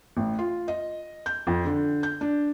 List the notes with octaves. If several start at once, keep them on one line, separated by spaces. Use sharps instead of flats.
A1
F4
D#5
G6
F2
D3
G6
D4